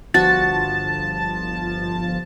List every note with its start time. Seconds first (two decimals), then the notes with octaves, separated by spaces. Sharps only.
0.14 G1 F3 F#4 A5 A6